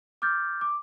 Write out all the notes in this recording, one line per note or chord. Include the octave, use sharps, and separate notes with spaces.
D6 F6 G6 A6
D6